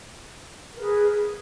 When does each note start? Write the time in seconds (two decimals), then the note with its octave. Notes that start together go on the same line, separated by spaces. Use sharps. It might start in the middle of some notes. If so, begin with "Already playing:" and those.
0.72 A#4
0.76 B4
0.80 G#4